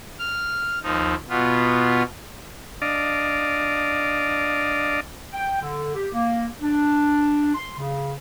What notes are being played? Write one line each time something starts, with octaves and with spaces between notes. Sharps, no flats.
F6
D#2 F3 D#4
B2 B3 F4
D4 D5 D#5 F5
G5
D3
G4
A#3
D4
C6
C#3